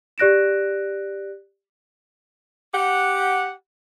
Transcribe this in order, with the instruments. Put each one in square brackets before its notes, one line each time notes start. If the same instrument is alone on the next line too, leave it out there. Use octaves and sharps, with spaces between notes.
[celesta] G4 D5 F#6 A#6 D7 E7
[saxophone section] G4 F#5